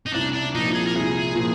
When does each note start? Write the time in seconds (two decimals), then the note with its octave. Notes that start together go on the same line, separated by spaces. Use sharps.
0.07 D#4
0.14 C2 D4
0.34 D4
0.54 A#2 F3 D#4
0.74 G#4
0.87 A#4
0.95 C2 G#4
1.35 A#2 F3